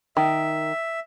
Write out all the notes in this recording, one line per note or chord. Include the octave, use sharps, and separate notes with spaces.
D#3 E5